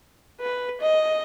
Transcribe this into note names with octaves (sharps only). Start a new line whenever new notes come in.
B4
D#5